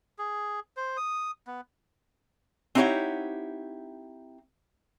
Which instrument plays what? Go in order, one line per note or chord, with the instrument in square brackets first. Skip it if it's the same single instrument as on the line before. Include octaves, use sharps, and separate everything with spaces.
[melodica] G#4
C5
D#6
B3
[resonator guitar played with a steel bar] C4 D#4 E4 G4 C#5 F#5